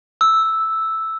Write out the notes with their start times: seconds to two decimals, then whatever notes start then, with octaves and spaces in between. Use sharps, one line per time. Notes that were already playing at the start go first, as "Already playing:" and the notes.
0.21 E6